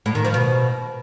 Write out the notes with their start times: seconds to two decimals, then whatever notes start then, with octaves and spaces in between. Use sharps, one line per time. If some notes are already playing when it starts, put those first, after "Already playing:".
0.06 A2
0.15 D#3
0.25 F3
0.34 B2